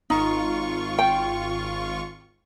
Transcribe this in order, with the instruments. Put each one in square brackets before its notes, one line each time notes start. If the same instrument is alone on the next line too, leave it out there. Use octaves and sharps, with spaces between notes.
[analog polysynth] G#1 F4 C#6 [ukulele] D#4
[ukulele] G5